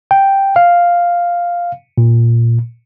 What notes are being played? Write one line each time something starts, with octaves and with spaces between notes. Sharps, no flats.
G5
F5
A#2